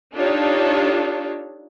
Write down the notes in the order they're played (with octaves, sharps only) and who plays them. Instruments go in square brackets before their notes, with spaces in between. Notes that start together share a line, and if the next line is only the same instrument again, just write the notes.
[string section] D4 D#4 F4 G4 A4 C#5